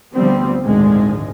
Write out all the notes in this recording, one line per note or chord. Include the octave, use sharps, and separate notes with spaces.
D2 D3 F3 G3 B3 C4
G#1 D2 A#2 D3 F3 G#3